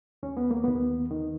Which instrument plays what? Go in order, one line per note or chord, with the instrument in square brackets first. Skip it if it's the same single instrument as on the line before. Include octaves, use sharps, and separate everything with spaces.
[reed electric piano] D#2 C#4
B3
A#3
D#2 B3
D#3